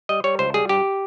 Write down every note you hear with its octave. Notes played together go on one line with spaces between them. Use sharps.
G3 D#5
G3 C#5
C#2 C5
G3 G#4
G2 G4